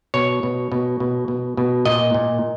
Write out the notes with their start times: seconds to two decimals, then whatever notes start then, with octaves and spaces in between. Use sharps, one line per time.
0.14 B2 C#5
0.43 B2
0.72 B2
1.00 B2
1.28 B2
1.57 B2
1.85 A#2 D#5
2.14 A#2